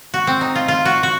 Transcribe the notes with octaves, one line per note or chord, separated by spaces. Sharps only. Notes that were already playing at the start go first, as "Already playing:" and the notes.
F#4
C4
D#4
F4
F4
F#4
F#4